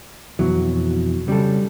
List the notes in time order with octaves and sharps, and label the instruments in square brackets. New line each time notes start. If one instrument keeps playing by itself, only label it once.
[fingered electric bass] F2 B2 E3 [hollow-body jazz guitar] F#3
[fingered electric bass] C#3 [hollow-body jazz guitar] G3 A4